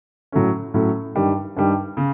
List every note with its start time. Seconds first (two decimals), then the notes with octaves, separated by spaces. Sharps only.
0.32 A2 F#3 A3 C#4
0.74 A2 F#3 A3 C#4
1.16 G2 D#3 G3
1.56 G2 D#3 G3
1.97 C#3